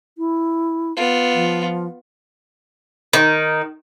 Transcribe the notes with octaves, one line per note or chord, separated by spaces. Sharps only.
E4
B3 F4
F3
D#3